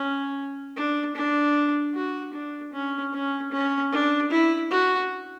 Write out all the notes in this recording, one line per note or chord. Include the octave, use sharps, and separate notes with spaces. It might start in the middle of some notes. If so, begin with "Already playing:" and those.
Already playing: C#4
D4
D4
F#4
D4
C#4
C#4
C#4
D4
E4
F#4